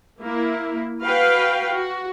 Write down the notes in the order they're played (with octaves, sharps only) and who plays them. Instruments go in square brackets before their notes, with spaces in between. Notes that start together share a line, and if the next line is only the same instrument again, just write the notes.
[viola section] A#3 E4
F#4 B4 F5 G5
F#4